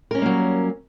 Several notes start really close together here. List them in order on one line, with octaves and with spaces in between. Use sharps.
A#4 C#4 G3 A#3 F#3